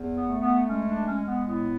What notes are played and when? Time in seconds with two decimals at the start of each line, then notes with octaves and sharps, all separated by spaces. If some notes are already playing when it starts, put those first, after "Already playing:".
Already playing: E2
0.16 B3
0.29 A3
0.42 B3
0.68 G#3 C#4
0.88 D4
1.07 G#3 C#4
1.27 B3
1.47 A2 B3